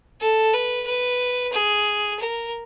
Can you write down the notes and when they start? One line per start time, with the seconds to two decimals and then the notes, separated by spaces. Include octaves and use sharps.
0.21 A4
0.53 B4
0.87 B4
1.53 G#4
2.20 A#4